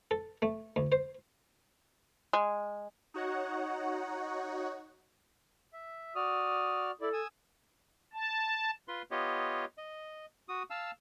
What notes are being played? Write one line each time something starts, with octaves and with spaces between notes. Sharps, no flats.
A4
A3
D2
C5
G#3
D#4 F#4 C#5 F#5
E5
F#4 D5 D#6 F6
E4 A4 D5
G#5 D#6 E6
A5
F4 B4 C6
B3 F4 G4 C#5 D#5
D#5
F#4 D#6
F5 A5 E6